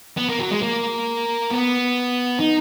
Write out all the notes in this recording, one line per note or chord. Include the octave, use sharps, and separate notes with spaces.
B3
A#3
F#3
G#3
A#3
B3
D#4